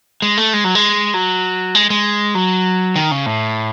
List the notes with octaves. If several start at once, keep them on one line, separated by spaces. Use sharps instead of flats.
G#3
A3
G#3
F#3
G#3
F#3
G#3
G#3
F#3
D#3
C#3
A2